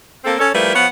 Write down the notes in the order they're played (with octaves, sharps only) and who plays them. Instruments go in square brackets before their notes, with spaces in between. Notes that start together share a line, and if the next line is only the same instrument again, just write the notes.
[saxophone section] A#3 C4 A4
C#4 A4 C#5
F3 G3 A3 E4 A#4 B4
F3 B3 C#5 F#5